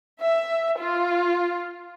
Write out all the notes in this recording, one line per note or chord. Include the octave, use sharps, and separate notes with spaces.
E5
F4